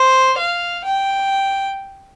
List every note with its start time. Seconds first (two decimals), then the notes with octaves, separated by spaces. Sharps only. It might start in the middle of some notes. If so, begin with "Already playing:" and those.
Already playing: C5
0.38 F5
0.84 G5